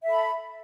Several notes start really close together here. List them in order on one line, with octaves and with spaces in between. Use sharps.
E5 A4 B5